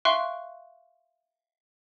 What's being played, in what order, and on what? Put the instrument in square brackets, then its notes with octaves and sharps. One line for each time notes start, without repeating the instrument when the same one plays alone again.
[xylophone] E5 F5 G5 C6 C#6 F#6